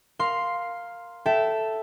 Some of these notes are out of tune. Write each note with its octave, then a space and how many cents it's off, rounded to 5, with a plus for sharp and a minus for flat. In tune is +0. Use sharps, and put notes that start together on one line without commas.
A#4 +0 F5 +5 C6 +0
A4 +0 E5 +5 G5 -25